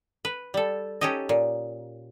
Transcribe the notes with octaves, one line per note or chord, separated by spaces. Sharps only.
B4
G3 A4
C#4 D#4 G4 A4 D#5
A#2